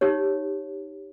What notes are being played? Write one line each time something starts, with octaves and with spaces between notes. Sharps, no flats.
D#4 G4 C#5